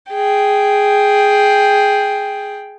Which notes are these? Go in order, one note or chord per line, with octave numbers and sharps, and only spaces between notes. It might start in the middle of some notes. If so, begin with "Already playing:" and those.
G#4 G5